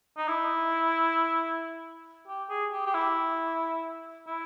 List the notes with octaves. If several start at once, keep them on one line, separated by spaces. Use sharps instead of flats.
D#4
E4
G4
G#4
G4
G4
E4
E4